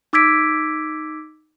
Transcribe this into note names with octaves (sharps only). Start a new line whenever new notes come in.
D#4 D6 E6 G#6 B6 D7